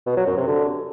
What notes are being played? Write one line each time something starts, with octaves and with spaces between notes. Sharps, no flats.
B2
F#3
F#2
C3
D3